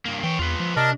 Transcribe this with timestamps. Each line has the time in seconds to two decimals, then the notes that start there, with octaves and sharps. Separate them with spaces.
0.05 G2 A#3
0.24 E3 C#5 G5
0.39 E2 F4 B4
0.60 F3
0.77 C3 D4 A#4 D#5 A5